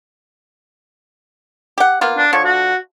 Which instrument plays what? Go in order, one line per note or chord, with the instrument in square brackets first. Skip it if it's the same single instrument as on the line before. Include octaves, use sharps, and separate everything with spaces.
[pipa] G4 F#5
A#3 B3 F4
[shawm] D4
[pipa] D3 F3 [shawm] C#5
[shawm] F#4